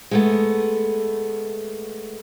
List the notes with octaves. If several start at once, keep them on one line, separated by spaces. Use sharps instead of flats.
G#3 A3 B3